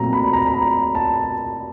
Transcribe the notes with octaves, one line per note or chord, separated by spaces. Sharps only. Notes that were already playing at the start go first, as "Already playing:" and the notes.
Already playing: A#2 F#3 A3 C4 A#5
B5
A#5
B5
A#5
A5